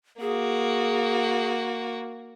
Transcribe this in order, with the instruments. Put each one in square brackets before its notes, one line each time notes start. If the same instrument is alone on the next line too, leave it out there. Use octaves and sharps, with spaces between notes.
[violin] A#3 F#4 [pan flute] G#4